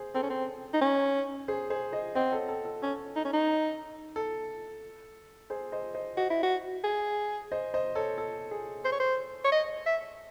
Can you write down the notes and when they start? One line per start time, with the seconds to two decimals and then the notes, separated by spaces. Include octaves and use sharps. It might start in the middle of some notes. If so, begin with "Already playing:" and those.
Already playing: G#4 C5
0.15 C4 A4
0.23 C#4
0.30 C4
0.73 D#4
0.81 C#4
1.48 G#4 C5
1.70 G#4 C5
1.92 C5 D#5
2.15 C4 D#5 F#5
2.32 A4 C#5
2.49 A4
2.65 A4
2.82 C#4 A4
3.16 D#4
3.25 C#4
3.33 D#4
4.16 A4
5.50 G#4 C5
5.72 C5 D#5
5.95 C5 D#5
6.17 F#4 C5 D#5
6.30 E4
6.43 F#4
6.84 G#4
7.52 C5 D#5
7.74 C5 D#5
7.95 A4 C#5
8.18 A4
8.51 G#4
8.85 C5
8.92 C#5
9.00 C5
9.44 C#5
9.52 D#5
9.86 E5